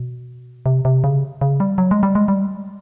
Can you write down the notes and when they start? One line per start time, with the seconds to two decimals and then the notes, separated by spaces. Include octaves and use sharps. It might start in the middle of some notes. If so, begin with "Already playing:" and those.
Already playing: B2
0.66 C3
0.85 C3
1.04 C#3
1.41 C#3
1.60 G3
1.78 F#3
1.91 G#3
2.03 G3
2.15 G#3
2.28 G3